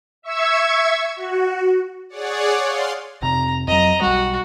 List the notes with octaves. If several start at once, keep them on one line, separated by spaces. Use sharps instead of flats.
E5 C#6 E6 G#6
F#4
G#4 C#5 D5 F#5
F5 C6
F1 C3 A#5
F2 F#3 D#5 A#5
B1 G3 F#4